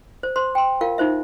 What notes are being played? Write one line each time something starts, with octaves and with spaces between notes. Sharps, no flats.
C5
C5 C6
G5 C6
F4 A#4 F5
D#4 F4 C5 E5